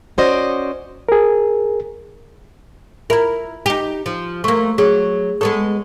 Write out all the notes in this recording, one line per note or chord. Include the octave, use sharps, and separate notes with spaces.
C#4 F#4 C5 D5 D#5
G#4 A#4
E4 F4 A#4 E5 B5
D#4 G4
F3
A3 A#3 C6 C#6
F#3 G#4 C#5
G#3 B3 A4 C#5 C#6 D#6